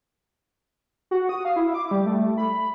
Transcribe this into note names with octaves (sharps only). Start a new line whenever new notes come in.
F#4
D#6
F5
E4
D6
G3
A3
B5